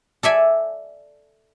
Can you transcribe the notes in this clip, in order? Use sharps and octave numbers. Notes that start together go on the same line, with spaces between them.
A4 D5 E5 G#5